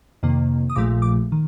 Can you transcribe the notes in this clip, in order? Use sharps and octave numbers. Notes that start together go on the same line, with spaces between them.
F2 C3 D#3 A#3
D#6
A#1 A#2 F3 A3 D6
D6
D#3